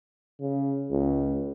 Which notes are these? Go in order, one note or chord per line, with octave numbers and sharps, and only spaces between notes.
C#3
C#2